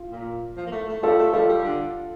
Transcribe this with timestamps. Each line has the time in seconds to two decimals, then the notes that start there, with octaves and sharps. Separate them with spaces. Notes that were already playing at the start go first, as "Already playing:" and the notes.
Already playing: F4
0.12 A#2
0.57 F3
0.67 A#3
0.72 A3
0.88 A3
1.02 G3 F4 A4
1.19 A3
1.33 G3 F4 A4
1.49 G3
1.64 D3